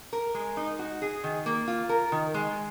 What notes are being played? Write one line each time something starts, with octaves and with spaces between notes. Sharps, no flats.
A#4
G#3
D#4
F#4
G#4
D#3
A#3
F4
A#4
D#3
G#3